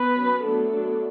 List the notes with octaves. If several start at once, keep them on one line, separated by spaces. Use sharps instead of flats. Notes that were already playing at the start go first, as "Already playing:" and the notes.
Already playing: B3 B4
F#3 C#4
F#3 A3 B3 D4 A4
F#3 B3 D4